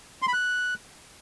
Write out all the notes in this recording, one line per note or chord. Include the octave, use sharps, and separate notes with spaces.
C6
B5
F#6